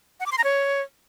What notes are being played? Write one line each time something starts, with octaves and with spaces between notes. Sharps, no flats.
F#5
D6
C6
A#5
C#5